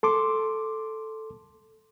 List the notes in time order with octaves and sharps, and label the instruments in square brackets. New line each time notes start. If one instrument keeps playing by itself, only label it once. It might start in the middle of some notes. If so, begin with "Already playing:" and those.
[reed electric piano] A4 C6 D6